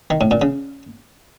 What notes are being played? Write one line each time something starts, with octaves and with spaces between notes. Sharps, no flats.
D#3
A2
A#2
C#3